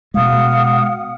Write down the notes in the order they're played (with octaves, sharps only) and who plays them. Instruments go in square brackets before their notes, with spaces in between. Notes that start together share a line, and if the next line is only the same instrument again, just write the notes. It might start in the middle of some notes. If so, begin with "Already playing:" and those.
[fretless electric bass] B2 G#3 [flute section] F5 F#5 D#6